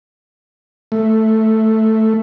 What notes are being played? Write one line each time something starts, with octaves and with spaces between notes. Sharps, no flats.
A3